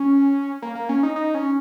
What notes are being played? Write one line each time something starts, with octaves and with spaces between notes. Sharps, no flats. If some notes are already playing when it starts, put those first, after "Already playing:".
Already playing: C#4
A#3
A#3
C#4
D#4
D#4
C#4